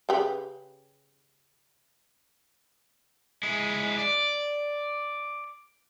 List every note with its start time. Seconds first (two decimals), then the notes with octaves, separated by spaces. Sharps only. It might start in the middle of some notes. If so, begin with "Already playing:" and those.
0.09 C#3 G4 B4
3.43 G#3 E4
3.98 D5